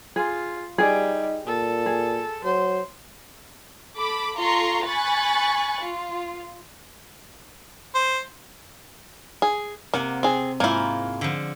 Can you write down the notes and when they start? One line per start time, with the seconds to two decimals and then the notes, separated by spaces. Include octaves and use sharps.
0.16 F4 G#4
0.78 G3 D#4 G#4
1.47 A#2 A4
1.86 G#4
2.44 F#3 C5
3.95 A4 B5 D6
4.37 F4 A4 A#5 C6 C#6
4.86 G#5 B5 C#6 F#6 A6
5.82 F4
7.95 C5
9.42 G#4
9.94 C3 A#3 F#5
10.23 C4 G#4
10.60 G#2 A#3 E4 F4
11.21 D3 F3